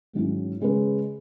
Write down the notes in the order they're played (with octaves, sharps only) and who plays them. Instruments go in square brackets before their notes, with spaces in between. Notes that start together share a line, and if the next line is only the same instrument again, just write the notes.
[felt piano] G#2 D#3 F#3 C#4 E4
C#3 G#3 C#4 G#4 B4